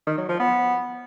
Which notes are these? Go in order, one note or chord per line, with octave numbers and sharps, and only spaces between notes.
D#3
F#3
F3
B3